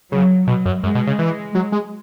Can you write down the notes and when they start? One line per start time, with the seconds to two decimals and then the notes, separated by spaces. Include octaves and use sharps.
0.12 C#3 F#3
0.47 B2 F#3
0.65 F#2
0.83 F#2 G#3
0.95 B2
1.07 C#3
1.19 E3
1.55 F#3
1.72 G#3